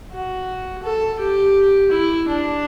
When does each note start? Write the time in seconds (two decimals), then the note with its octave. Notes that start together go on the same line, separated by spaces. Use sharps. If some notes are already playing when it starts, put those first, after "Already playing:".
0.12 F#4
0.83 A4
1.19 G4
1.91 E4
2.28 D4